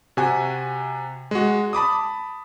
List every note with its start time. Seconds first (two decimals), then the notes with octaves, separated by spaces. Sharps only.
0.17 C3 F#4 G#5
1.31 G#3 F#4
1.73 A5 B5 D6 D#6